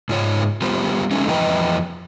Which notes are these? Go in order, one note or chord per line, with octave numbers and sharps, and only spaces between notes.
G#2 F4 C#5
G3 B3 F4 G4 C5
G#3 A3 C#4 D#4
F2 E3 B4 D#5 G5 A#5